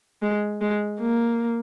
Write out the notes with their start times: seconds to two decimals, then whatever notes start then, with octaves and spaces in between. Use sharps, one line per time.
0.22 G#3
0.61 G#3
1.00 A#3